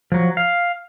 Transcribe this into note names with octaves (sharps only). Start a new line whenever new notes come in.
F3 F#3
F5